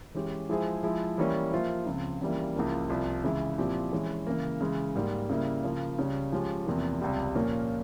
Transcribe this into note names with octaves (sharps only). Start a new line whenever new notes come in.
E3 G#3 C#4 G4
F3 G#3 E4 G#4 C5
F3 G#3 E4
E3 G3 A#3 C#4
F3 A#3 F4 C5 E5
C#2 C#3 F3 C4
C#2 C#3 E3 G3 A#3
C#2 C#3 F3 A#3 E4
C2 C3 F3
C#3 E3 G#3 E4
A#2 F3 C4 E4 G4
E3 G#3 C#4
C#3 E3 A#3
C#3 E3 G#3
G#2 G3 A#3
C#3 G3 A#3 E4
C#3 F3 A#3
C#2 C#3 G3 C#4
F3 G#3 C#4 G4
E2 C3 F3 A#3
C#2 C3 G3
A#2 F3 A#3 C#4